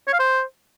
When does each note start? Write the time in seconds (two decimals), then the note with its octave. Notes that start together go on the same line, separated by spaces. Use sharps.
0.07 C#5
0.13 F5
0.19 C5